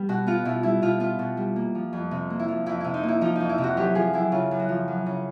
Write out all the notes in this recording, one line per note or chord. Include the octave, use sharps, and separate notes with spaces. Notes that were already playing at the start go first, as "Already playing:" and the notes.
Already playing: G3 B3
B2 F#4
B3 F4
B2 E4
G3 E4
B2 F4
B3 F4
B2
G3
A#3
F3
F2
C3
A#3
E4
F3
F2 E4
C3 E4
D#4
A#3
E4
F3 D#4
F2 D#4
E4
C3
F#4
F#2 G4
F3 G#4
F#2 E4
C#3 F4
F#2
F#4
F3
F#2
C#3